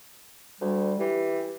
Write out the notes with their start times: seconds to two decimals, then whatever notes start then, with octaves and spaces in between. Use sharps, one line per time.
0.61 D2 G3
1.00 E3 G4